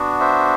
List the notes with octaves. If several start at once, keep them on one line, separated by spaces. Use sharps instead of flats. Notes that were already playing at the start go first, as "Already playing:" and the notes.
Already playing: B3 D4 F#4
C5 E5